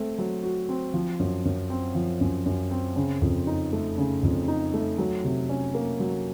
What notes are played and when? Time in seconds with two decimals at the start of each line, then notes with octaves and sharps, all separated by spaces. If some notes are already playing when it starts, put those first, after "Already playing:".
Already playing: A3 C4
0.19 F#3
0.43 F#4
0.69 C4
0.94 F3
1.19 F#2
1.45 F#2
1.70 C4
1.95 F3
2.21 F#2
2.46 F#2
2.71 C4
2.96 C#3
3.22 F2
3.47 D#4
3.73 A3
3.98 C#3
4.23 F2
4.48 D#4
4.74 A3
4.98 F#3
5.24 C3
5.49 C#4
5.74 A#3
6.00 F#3